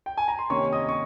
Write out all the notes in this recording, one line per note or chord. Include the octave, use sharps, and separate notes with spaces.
G5
G#5
A#5
C6
C3 D#3 A#3 C#4 C#5 C#6
D#5 D#6
C#6